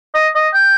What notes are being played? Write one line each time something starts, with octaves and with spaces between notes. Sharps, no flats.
D#5
D#5
G5